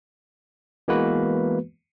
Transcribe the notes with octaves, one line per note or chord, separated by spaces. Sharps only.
E3 G#3 A#3 B3 F#4 B4